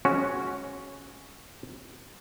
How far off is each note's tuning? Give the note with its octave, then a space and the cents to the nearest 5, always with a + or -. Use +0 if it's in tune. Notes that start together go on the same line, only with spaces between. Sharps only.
G#3 +20 C#4 +0 F#4 +0